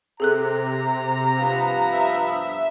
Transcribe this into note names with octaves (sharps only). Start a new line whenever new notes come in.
C3 G#4 A4 A#5 F#6
G2 F3 B3
E5